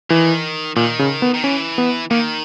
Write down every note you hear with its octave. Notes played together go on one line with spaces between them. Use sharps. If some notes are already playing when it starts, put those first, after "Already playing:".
D#3 E3
A#2 D#3
C#3
B3
D#3
E3 C#4
B3
D#3 A#3